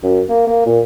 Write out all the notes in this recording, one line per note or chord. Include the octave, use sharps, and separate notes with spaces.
F#2
A#3
A#3
A#2